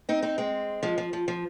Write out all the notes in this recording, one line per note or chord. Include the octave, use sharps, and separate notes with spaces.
C4 D#4
C4 D#4
G#3 C4
F3 G#3
F3
F3
F3